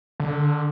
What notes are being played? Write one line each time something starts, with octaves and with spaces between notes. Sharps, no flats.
D3